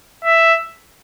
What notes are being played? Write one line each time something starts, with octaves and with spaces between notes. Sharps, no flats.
E5